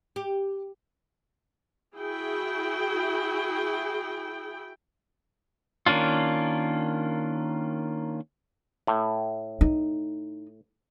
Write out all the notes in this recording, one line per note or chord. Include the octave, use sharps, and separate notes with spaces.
G4
E4 F#4 G#4 G5
D#3 A#3 C#4 D4 F4
A2
D#4